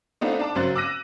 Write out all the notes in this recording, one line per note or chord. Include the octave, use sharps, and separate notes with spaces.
A3 B3 C4 D4 D#4 F4
D4 A5 D6
G#1 C#3 F#3 C5 F#6 A6
D6 E6 F#6 A#6 D#7